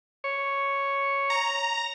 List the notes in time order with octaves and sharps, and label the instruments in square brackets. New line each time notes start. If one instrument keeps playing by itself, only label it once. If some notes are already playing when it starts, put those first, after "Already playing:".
[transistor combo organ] C#5
[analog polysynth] A#5